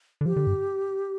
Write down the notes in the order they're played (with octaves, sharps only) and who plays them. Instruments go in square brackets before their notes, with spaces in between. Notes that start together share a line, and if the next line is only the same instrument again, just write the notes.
[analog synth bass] D3
[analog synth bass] F3 [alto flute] G4
[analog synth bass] D3
G2